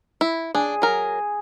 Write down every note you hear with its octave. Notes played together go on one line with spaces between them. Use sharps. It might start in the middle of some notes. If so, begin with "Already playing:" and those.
E4
D4 G#4
F#3 A#4